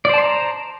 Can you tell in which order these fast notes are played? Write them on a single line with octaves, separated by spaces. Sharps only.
D5 C5 A5 C6 A#5